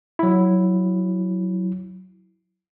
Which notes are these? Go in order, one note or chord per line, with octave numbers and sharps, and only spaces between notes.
F#3 E4